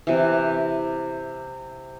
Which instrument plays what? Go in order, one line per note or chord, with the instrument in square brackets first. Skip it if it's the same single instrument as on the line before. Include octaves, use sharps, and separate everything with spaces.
[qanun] C3 E3